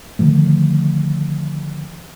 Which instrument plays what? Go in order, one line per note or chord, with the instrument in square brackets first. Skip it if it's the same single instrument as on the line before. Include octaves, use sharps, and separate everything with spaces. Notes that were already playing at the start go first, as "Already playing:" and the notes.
[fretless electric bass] D3 D#3 F3 A3